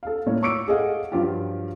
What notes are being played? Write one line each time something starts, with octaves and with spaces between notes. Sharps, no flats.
A4 F5
A2 A#3 C#5
C#6 D6 E6 C#7 D7
G#4 A4 D#5 F5 F#5
G2 F3 F#3 F4 G4